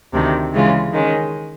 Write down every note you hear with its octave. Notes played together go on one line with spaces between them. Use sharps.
D2 C3 D#3
C#3 E3 G#3 C#4 F4
D#3 G#3 C#4